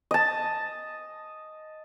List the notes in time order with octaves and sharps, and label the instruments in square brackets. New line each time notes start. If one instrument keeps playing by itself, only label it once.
[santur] D#5 A5